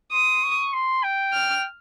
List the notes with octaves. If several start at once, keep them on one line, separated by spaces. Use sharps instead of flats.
C6 D#6
C#6
C6
G5
F6